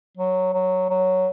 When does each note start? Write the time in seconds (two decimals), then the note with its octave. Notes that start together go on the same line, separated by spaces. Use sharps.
0.17 F#3
0.53 F#3
0.90 F#3